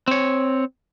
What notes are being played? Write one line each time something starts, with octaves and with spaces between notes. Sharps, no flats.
C4 C#5